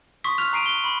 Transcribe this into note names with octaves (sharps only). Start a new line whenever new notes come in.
C6 C#6 D#6 B6
F6 F#6 B6 F7
A#5 C7 D7 D#7 F7
G7
B5 C6